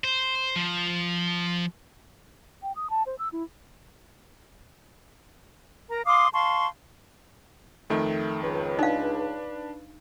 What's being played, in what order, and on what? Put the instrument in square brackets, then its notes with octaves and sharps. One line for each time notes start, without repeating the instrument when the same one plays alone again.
[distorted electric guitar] C5
F3
[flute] G5
D#6
A5
C5
E6
E4
[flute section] A#4 A#5
F5 C6 D6 D#6
F5 A5 C6 C#6
[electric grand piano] F2 D#3 [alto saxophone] A3
[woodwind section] C#2 [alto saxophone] B4
[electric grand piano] D4 [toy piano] D#4 F5